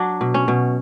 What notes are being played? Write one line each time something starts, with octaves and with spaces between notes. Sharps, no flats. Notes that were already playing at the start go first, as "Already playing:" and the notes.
Already playing: F#3 D4
B2
C#4
B2